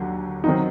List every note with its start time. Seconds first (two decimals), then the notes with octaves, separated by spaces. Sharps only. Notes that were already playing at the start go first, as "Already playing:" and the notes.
Already playing: D#2 D3 F#3
0.44 D#3 F#3 C4 D#4